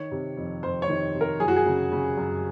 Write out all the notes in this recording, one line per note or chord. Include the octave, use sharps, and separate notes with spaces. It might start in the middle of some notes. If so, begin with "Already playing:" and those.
Already playing: D#3 C#5
C3
F2
F2 C5
C#5
D#3
C3
A#4
F#2 G#4
F#4
G#4
C#3
C#3
F#2